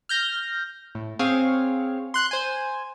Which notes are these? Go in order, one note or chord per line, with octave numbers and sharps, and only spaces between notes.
F6 G6 A#6
A2
C4 G#4 C#5 F5
C6 F#6
C5 G#5